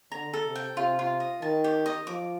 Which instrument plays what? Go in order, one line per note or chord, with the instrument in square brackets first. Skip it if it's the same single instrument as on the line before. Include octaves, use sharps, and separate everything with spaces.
[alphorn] D3 [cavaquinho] A#5
[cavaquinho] A4
[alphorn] C3
[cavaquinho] G5
[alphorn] C3 [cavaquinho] F4
[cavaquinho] F4
D#5
[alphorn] D#3 [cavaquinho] A5
[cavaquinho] G4
D#5
[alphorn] F3 [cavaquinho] D6